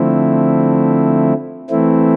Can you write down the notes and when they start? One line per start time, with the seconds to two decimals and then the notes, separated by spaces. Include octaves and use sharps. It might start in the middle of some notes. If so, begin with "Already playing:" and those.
Already playing: D3 F3 A3 C4 E4
1.70 E3 A3 C4 E4